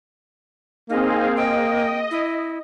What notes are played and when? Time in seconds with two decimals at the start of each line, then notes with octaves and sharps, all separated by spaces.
0.89 A#3 C4 D#4 G#4 F5
1.37 D#5 G5
2.11 E4